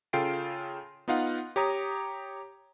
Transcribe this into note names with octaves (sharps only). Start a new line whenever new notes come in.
C#3 F4 A4 G5 C7 D7
B3 D#4 F4 F5 F#5
G4 C#5 A#5 D#6